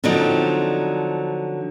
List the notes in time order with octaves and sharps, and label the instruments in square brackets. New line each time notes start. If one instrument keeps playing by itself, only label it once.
[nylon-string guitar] D3 F3 F#3 C4 D4 D#4